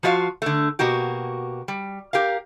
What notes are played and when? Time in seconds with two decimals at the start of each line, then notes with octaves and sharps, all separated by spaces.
0.03 F3 F4 F#4 E5 F5
0.42 D3 A3
0.79 B2 A#3 F#4 G4
1.68 G3
2.13 G4 A#4 F5